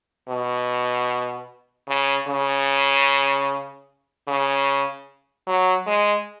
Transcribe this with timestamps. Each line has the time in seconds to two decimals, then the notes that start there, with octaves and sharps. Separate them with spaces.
0.28 B2
1.88 C#3
2.28 C#3
4.28 C#3
5.47 F#3
5.87 G#3